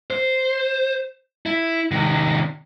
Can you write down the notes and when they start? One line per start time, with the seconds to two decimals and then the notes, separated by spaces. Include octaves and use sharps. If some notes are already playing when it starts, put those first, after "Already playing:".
0.11 C5
1.46 E4
1.91 C3 D#3